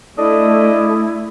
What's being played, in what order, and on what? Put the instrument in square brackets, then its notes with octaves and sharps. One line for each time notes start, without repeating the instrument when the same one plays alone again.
[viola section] A3 [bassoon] D4 [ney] E4 [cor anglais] D#5